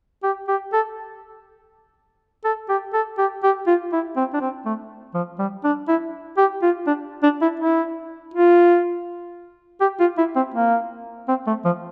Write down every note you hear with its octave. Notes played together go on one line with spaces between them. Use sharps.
G4
G4
A4
A4
G4
A4
G4
G4
F4
E4
C4
D4
C4
A3
F3
G3
D4
E4
G4
F4
D4
D4
E4
E4
F4
G4
F4
E4
C4
A#3
C4
A3
F3